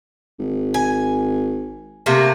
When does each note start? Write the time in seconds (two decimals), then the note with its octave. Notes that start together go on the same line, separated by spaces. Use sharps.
0.39 G#1
0.74 G#5
2.06 C3 A3 A#3